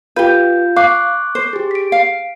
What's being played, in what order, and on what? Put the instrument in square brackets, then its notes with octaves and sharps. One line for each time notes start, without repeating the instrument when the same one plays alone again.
[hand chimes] F4 F5 G6 [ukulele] G4 B4
[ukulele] F5 [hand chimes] C#6 D6 F#6
[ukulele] C5
[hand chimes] G4 G#4
B6 D7
[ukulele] F5